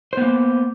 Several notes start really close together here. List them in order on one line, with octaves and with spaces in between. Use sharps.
C5 B3 A#3